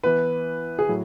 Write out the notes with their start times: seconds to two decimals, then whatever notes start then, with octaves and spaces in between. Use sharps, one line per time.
0.04 E3 B3 E4 B4
0.79 G#4
0.89 A2 F#3